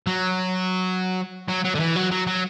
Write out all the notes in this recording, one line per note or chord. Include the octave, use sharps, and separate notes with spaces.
F#3
F#3
F#3
D3
E3
F#3
F#3
F#3